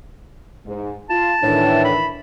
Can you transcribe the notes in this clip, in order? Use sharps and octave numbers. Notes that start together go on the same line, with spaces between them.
G#2
F4 A5
A2 D#3 E3 D4
B5